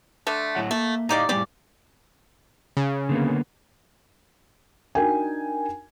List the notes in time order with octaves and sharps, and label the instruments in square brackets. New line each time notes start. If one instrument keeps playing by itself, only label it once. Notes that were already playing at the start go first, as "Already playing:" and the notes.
[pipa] D3 A3
[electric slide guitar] A2 F#3 F#5
[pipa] A3 [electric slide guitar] A#3
[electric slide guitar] A2 D#5 F5 [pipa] D#4 G4 D5
[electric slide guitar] A2 G3 B3 [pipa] C#3 G4 D5
[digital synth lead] C#3
[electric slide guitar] D3 A#3 B3
[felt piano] D4 D#4 F#4 A#4 G5 G#5